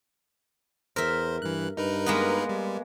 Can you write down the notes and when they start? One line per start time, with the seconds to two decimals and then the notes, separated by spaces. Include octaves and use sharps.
0.96 E2 A#4 C5 E5
1.42 G2 E3 F#6
1.77 G2 D#4 A#4 B4
2.06 G#3 A#3 B3
2.49 G3